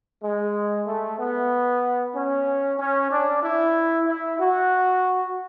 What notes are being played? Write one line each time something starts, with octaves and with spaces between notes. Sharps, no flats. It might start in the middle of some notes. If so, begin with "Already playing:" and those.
G#3
A3
B3
C#4
C#4
D4
E4
E4
F#4